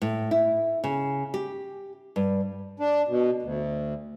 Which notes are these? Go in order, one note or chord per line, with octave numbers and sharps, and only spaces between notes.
A2
E4
C#3
G4
G2
D4
B2
D2